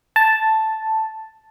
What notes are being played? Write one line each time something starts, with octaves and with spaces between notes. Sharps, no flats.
A5